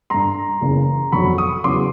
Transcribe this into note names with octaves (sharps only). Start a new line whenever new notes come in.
G2 D3 G3 A#5 C6
F#1 E2 C#3
G1 F2 D3 F#3 B5 C#6
C#6 D#6
E2 C#3 F#3 C6 D6